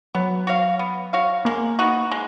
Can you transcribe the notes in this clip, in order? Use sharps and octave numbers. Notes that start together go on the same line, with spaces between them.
F#3 B3
F#4 C#5 F5
B3
F#4 C#5 F5
G#3 A#3
B3 D#4 F#4
G#3